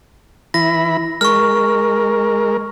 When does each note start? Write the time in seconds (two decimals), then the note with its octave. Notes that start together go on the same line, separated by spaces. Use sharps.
0.54 E3 E4 B5 A#6
1.21 G#3 A#4 C#6 F6